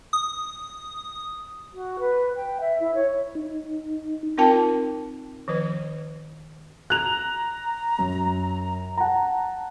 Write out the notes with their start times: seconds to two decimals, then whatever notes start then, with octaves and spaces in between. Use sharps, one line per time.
0.13 D#6
1.73 F#4
1.99 B4
2.36 G5
2.60 E5
2.79 E4
2.94 C#5
3.35 D#4
4.38 C4 D#4 F4 A#4 G5 A5
5.48 D#3 F3 B4
6.90 A#5 F#6 F7
7.99 F#2
8.97 F#5 A5 A#5